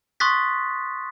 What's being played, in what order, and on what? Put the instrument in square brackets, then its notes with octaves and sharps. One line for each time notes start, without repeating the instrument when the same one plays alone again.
[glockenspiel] C6 C#6 D#6 F#6 A6 B6